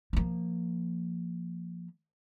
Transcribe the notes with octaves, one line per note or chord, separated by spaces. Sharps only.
F3 A#3